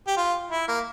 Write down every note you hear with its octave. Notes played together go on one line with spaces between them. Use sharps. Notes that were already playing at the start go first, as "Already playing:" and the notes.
G4
F4
E4
A#3